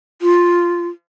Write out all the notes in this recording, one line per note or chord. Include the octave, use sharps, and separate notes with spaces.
F4